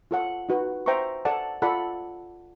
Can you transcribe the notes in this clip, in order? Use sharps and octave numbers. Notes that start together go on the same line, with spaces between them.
F4 A4 C#5 F#5
D#4 F#4 B4
C5 E5 G5 A#5 C#6
A4 D5 F#5 A5
F4 A4 D5 F#5 B5